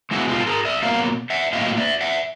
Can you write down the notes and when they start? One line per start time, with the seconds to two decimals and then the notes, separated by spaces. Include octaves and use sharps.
0.11 B2 G#3 E4 F#4
0.29 F4 G4
0.40 A4
0.47 G#4 A#4
0.65 D5 E5
0.82 B2 F#3 A#3 F5
1.30 E5 F#5
1.53 A2 F#3 A#3 D#5 F5
1.77 D5 E5
2.01 E5 F#5